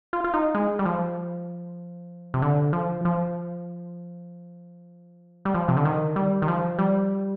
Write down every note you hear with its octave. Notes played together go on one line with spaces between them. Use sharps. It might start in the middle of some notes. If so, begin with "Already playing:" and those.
F4
F4
D#4
G#3
G3
F3
C3
D3
F3
F3
G3
F3
C3
D3
D#3
G3
D#3
F3
G3